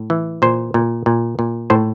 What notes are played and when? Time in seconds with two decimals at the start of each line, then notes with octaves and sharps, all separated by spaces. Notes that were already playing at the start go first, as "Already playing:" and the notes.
Already playing: A2
0.10 E3
0.42 A#2 C5
0.74 A#2
1.06 A#2
1.39 A#2
1.70 A2 C5